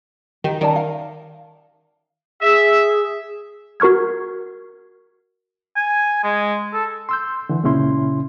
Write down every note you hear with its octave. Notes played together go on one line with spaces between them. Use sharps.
D#3 G4 G5
D#3 C#4 D5 A5
F5
G#4 E5
F#4 A#4 C#6 F6 G#6
G#5
G#3
A4
C6 E6 G6
D3 E3
C#2 A#2 C#3 C#4 E4 C6